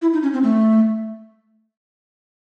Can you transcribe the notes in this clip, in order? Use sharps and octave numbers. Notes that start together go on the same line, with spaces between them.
E4
D#4
C#4
C4
A3